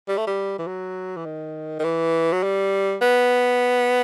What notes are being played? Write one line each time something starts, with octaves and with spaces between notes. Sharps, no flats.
G3
A3
G3
E3
F#3
E3
D#3
D#3
E3
F#3
G3
B3